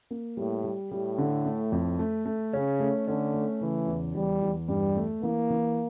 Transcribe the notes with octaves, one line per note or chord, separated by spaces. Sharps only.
A#3
A2 G3
G3
A2 G3
D3
A3
F2
A3
A3
C#3 C#4
A3
D3 C#4
A3
C#3 E3
E2
E2 G3
E2
G2 G3
A3
E3 A#3
E3